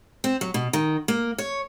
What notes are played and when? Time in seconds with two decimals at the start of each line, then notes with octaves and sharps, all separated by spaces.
0.24 C4
0.41 F#3
0.54 B2
0.73 D#3
1.08 A#3
1.38 C#5